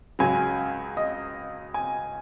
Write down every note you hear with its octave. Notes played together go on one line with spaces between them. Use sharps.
C#2 C#3 F#3 G#5
D#5
G#5